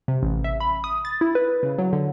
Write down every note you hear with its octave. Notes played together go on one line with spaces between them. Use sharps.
C3
A1
E5
B5
D#6
A6
E4
B4
C#3
F#3
D3